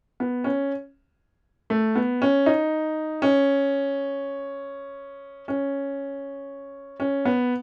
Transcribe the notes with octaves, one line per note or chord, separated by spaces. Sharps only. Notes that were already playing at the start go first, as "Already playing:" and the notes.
B3
C#4
A3
B3
C#4
D#4
C#4
C#4
C#4
B3